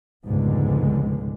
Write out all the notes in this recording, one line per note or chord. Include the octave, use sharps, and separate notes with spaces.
F1 C#2 G#2 B2 D3 G#3